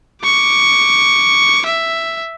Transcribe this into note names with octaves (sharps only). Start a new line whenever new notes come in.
C#6 D6
E5